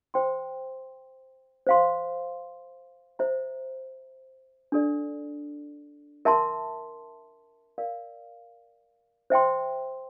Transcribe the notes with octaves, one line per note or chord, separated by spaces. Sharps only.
C5 G5 C6
C5 F5 C6
C5 E5 A#5
D4 A4 D5
A#4 E5 A5 C6
A#4 D5 F5
C5 E5 G5 C6